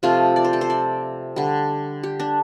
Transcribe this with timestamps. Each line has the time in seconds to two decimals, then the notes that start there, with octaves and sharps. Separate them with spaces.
0.03 C3 F3 A3 F4
0.36 D5
0.45 C5
0.53 A4
0.61 C5
0.70 D5
1.36 D3 G3
2.03 G4
2.20 D4